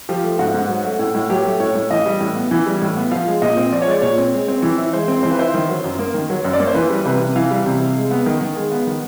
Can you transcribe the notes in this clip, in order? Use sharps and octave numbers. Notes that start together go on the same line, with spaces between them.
F3 G4
A3
G#2 F#4
G#2
F#3
A3
A2
A2
F#3 G4
A3
A2 C#5
A2
E3 D#5
G3
A2
B3
E3
G3
A2
B3
F3 F5
G#3
A#2 D#5
C4
F3 D5
C#5
G#3 D5
A#2 C#5
C4
G#3
C4
E3
E4
G#3 C5
C4
E3 C5
B4
E4 C5
D#3
F#3
F#2
A#3
D#3
F#3
F#2
D5
A#3 C#5
C5
E3 B4
G3
C3 B4
C3
E3 F5
G3
C3
C3
G#3
B3
D#3
D#3
G#3
B3
D#3